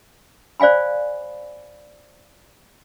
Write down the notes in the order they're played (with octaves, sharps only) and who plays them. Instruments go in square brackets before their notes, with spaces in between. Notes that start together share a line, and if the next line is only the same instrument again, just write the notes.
[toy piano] C5 D5 F5 G#5 B5